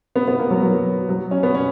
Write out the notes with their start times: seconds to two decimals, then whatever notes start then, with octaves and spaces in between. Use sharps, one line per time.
0.16 B3
0.28 B3
0.39 A#3
0.51 F#3
0.62 F#3
1.09 F#3
1.31 C#4
1.43 B3
1.55 C#4